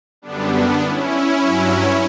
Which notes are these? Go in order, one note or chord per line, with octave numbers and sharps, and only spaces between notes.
F#2 D3 G3 B3 D4
B3 D4
C#4 E4
G2 F#3